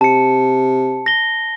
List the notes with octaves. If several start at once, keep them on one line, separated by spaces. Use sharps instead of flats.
C3 A5 C#7
A#6 G7